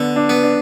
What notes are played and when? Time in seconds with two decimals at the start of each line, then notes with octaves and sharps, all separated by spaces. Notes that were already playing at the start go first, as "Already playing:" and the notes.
Already playing: D3 B3
0.16 D4
0.29 B3
0.43 D4